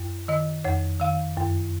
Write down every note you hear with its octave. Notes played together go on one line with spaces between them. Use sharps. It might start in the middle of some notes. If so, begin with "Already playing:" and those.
Already playing: F#2
D#3 D#5
F2 C#5
D#3 F5
F#2